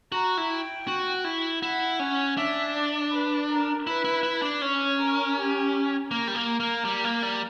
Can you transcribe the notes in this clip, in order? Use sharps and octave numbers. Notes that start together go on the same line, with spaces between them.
F#4 A#5
E4
G5
F#4
E4
E4 F#5
C#4
D4 E5
D5
B4
A#4
E4 B4
E4
E4
D4
C#4 C#5
A#4
G4
A#3 A#4
G3
A#3
A#3
G3
A#3
G3